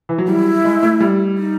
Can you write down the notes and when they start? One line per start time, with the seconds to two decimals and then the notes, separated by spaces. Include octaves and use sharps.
0.09 E3
0.18 F#3
0.28 G3 E4
0.64 G#3
0.83 A3
1.00 G3
1.37 D#4